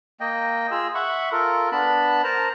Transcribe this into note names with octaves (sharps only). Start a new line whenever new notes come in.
A#3 D#5 G5
F4 G#4 E6
E5 F#5 B5 C#6
F4 A4 A#4
B3 D4 A5 B5
A#4 C5 A5 A#5